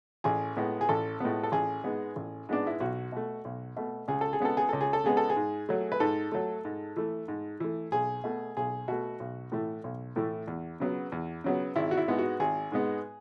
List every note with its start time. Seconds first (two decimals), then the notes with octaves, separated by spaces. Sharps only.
0.24 A1 G#4
0.57 A2 G#3 B3
0.81 G#4
0.89 A1 A4
1.20 A2 G#3 B3
1.43 A4
1.52 A1 G#4
1.84 G#2 G#3 B3
2.16 A1
2.49 G#2 G#3 B3 D4
2.67 E4
2.80 B1 F#4
3.12 B2 A3
3.45 B1
3.77 B2 A3
4.08 C#2 G#4
4.21 A4
4.33 G#4
4.40 C#3 G#3 B3 A4
4.57 G#4
4.69 C#2 A4
4.81 G#4
4.93 A4
5.04 C#3 G#3 B3 G#4
5.17 A4
5.30 G#4
5.36 G#2
5.69 F#3 A3
5.92 B4
6.00 G#2 A4
6.32 F#3 A3
6.65 G#2
6.96 E3 A3
7.28 G#2
7.60 E3 A3
7.92 B1 G#4
8.24 B2 A3
8.57 B1 G#4
8.88 B2 A3 F#4
9.20 B1
9.52 A2 E3 A3
9.84 B1
10.16 A2 E3 A3
10.47 E2
10.80 C#3 F#3 B3
11.12 E2
11.44 C#3 F#3 B3
11.76 G#1 E4
11.91 F#4
11.97 E4
12.08 G#2 G#3 B3
12.19 F#4
12.40 G#1 G#4
12.72 G#2 G#3 B3